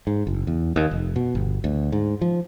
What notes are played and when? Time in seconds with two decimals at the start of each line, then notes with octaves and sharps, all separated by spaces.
0.07 G#2
0.27 F#1
0.47 E2
0.76 D#2
0.91 F1
1.16 B2
1.35 G1
1.64 D2
1.92 G#2
2.21 F3